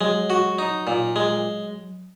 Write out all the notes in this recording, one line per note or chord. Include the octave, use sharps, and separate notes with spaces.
F#3 G#3
F#4
D#4
A#2
G#3